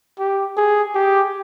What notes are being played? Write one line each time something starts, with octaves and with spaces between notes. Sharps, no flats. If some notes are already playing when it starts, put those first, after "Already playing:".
G4
G#4
G4